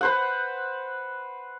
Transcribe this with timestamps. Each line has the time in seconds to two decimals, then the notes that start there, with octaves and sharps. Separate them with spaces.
0.01 B4 C5 F#5